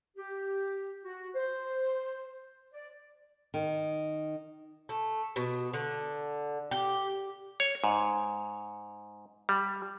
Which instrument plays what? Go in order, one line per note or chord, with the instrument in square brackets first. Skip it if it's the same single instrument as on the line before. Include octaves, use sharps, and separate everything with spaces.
[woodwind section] G4
F#4
C5
D5
[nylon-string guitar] D#3
[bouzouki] A3
B2
D3
G4
[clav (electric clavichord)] C#5
G#2
G3